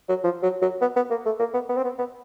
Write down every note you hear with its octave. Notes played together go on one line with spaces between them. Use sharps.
F#3
F3
F#3
F#3
B3
B3
A#3
A3
A#3
B3
B3
C4
B3
B3